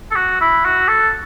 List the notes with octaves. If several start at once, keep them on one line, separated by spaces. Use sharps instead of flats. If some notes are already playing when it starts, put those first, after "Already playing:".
A4
F#4
E4
F#4
A4